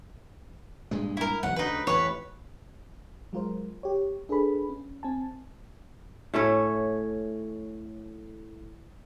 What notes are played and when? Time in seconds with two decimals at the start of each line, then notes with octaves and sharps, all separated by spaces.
0.91 G2 A#2 G#3
1.17 E4 A#4
1.43 E1 B1 F#5
1.56 D2 C#3 D#4 B4
1.87 A1 F2 B4 C#5
3.33 F#3 G#3 F4 A#4 C5
3.83 G4 C#5
4.29 D4 G#4 A4 B4 B5
4.70 C#4
5.03 C4 G#5 A5
6.34 A2 A3 C#4 C#5